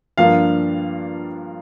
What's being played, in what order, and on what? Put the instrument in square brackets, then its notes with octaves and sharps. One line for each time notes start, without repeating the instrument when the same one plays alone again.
[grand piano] G2 F3 A#3 D4 F5